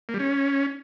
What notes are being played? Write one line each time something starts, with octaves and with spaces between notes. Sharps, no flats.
A#3
G3
C#4